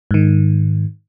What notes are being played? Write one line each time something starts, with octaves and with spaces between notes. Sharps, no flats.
G#2 D#3